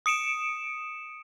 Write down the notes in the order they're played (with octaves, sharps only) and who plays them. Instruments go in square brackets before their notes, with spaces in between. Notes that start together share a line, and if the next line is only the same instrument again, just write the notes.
[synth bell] D#6 C#7 D7 E7